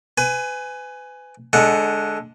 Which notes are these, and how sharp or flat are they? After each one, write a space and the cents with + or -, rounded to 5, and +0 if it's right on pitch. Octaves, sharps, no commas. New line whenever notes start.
B4 +30 G#5 +0
D3 +0 G#3 +20 F#5 +0